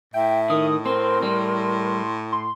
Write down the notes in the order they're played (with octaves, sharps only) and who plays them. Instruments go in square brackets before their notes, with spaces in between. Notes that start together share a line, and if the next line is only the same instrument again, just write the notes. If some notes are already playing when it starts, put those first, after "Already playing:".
[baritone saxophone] A2 [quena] E5 [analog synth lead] G5
[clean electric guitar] D#3 [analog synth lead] D#6
[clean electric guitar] C4 [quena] A#4 [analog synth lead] C6
[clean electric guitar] G3
[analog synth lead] C6